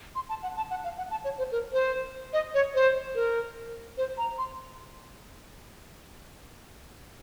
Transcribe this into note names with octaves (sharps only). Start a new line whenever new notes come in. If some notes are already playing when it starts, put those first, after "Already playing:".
C6
A5
F#5
A5
F#5
F5
F#5
A5
C#5
C5
A#4
C5
D#5
C#5
C5
A#4
C5
A#5
C6